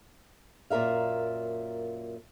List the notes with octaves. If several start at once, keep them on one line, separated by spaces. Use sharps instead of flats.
F#2 A#2 A#4 E5 F5